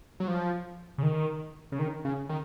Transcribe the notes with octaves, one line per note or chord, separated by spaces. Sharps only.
F#3
F3
C#3
D#3
C#3
D#3
C#3
D#3